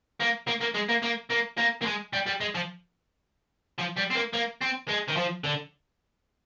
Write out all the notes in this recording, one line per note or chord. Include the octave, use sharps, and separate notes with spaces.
A#3
A#3
A#3
G#3
A#3
A#3
A#3
A#3
A#3
G#3
G3
G3
G#3
F3
F3
G3
C4
A#3
A#3
C4
G#3
D#3
F3
D3